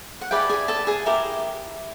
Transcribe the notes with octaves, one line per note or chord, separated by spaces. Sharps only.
F#5
E4 G4 G#4 B4 D5 G5
G#4 G#5
A4 A5
G#4 G#5
E4 G4 A#4